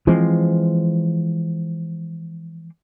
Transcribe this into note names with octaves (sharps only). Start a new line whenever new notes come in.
E3 F3 G#3 C4